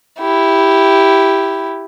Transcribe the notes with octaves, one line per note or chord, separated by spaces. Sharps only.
E4 G4